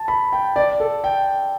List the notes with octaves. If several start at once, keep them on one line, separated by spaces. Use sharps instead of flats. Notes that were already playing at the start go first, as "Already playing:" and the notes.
Already playing: A5
B5
G5
D5
A4
G5